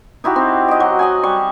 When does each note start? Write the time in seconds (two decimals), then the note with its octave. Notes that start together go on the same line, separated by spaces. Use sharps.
0.24 D#4 E4 F#4 G4
0.36 C4
0.68 D#5 D6
0.80 F#3
0.99 D#5 F#5 G#5
1.23 G3 C#6